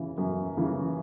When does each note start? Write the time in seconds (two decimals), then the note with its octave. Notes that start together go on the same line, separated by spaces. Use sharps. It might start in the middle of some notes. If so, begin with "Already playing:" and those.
Already playing: C#3 E3
0.18 F#2
0.57 C#3 E3